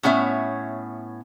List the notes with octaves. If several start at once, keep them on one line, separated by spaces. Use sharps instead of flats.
A2 B3 C#4 C#5 E5